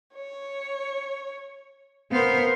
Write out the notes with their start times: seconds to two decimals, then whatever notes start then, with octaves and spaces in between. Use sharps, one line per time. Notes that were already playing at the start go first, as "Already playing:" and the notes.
0.14 C#5
2.12 B3 A#4 C5 F5